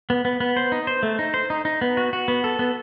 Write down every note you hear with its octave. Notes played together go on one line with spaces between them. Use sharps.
B3
B3
B3
C5
D#4
C5
A3
D#4
C5
D#4
D#4
B3
F#4
F#4
B3
A4
B3